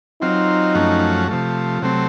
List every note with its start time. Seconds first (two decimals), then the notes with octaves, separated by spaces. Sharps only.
0.22 F#3 C4 D#4 F4
0.75 F#2 F3 A3 C#4 F#4
1.28 C3 F3 A3
1.82 C3 F#3 A3 C4